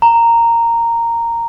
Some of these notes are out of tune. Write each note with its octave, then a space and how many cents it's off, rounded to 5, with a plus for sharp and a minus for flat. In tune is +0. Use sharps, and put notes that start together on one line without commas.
A#5 -10